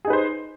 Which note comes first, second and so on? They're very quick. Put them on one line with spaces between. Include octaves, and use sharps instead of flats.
G#4 D#4 B4 C5